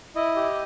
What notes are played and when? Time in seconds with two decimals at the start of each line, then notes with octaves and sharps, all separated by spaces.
0.15 E4 D#5
0.36 G4